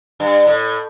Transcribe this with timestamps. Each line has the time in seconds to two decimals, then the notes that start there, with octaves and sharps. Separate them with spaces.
0.20 G2
0.47 A2